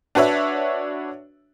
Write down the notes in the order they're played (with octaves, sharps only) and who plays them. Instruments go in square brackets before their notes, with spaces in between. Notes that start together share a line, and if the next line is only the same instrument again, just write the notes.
[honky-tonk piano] D4 F#4 B4 C#5 E5